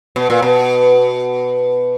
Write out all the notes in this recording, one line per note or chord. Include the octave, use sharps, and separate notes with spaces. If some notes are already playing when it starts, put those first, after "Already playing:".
B2
A#2
B2